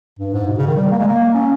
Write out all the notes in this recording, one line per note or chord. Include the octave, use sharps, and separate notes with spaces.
G2
G#2
B2
C#3
D#3
G3
A#3
G#3
A#3
C#4